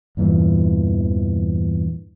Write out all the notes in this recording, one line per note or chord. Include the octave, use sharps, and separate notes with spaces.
E2 G2 A#2 E3